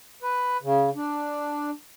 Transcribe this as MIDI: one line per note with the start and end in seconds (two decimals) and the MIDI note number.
0.22 0.57 71
0.62 0.90 49
0.95 1.70 62